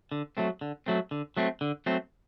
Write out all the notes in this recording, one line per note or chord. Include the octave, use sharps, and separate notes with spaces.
D3
F#3 A3 C4
D3
F#3 A3 C4
D3
F#3 A3 C4
D3
F#3 A3 C4